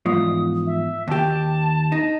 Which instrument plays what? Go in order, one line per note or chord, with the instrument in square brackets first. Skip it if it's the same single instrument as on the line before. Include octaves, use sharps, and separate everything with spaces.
[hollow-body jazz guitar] E2 G#2 F3 [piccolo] D#6
[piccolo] E5
[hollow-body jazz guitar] D#2 G4 [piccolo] A5
[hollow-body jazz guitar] D#4